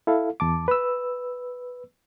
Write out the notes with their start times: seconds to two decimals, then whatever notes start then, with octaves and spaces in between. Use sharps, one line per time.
0.07 E4 A4 F5
0.40 E2 A5 D6
0.68 B4 E6